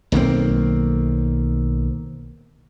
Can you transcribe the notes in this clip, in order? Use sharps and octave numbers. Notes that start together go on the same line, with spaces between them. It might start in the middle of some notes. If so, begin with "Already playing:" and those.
B1 D#3 A#3 C4